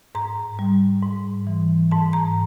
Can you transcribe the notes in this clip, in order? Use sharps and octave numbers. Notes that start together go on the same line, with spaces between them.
G#2 A#5
G3
G#2
E3
G#2 A5
A#5